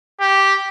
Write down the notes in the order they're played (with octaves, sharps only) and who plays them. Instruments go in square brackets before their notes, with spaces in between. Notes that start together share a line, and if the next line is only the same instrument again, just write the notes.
[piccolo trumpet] G4